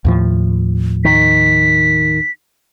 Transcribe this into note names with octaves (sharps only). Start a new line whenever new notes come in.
D#2 A2 F3
D#3 B6